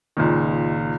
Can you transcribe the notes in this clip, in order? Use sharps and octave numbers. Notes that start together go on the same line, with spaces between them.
C#2 A#2 D#3